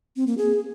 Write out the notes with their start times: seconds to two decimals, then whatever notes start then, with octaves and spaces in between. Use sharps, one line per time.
0.16 C4
0.27 A#3
0.38 G#4